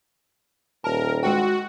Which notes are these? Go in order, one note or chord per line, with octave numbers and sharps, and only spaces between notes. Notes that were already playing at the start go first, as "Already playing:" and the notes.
D#1 A#4 A5
G#3 F#4 G5